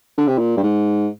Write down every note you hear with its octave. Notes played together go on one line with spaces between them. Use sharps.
D3
C3
A#2
G2
G#2